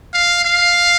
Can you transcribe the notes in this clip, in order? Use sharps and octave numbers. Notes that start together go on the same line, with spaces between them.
F5
F5